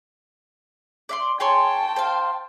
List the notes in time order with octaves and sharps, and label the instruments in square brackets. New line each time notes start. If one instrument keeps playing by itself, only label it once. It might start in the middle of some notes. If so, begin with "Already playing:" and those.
[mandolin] D5 E5 C6
[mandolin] G#4 C#5 C6 [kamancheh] G5 A5
[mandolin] C5 F5